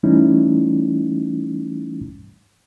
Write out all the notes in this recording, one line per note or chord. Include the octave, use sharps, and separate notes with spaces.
E3 G3 A3 C#4 D#4 E4